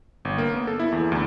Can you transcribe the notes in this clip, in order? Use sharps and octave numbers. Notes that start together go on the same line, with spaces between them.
G1
A#3
B3
A4
E4
E2
D2